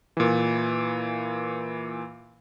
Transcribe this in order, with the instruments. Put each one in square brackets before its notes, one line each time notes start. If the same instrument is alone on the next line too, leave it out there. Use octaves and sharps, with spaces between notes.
[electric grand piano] A#2 E3